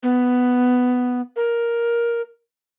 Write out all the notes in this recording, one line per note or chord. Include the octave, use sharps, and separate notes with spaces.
B3
A#4